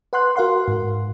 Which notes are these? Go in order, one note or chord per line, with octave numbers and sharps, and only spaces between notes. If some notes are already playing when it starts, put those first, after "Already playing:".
B4 F#5 C6 F#6
F#4 A#4 F5 F#5 C6
G#2